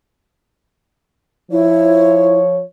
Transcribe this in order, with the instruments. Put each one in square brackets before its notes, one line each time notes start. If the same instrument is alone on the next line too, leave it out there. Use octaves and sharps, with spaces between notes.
[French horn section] F3 C#5 [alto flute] E4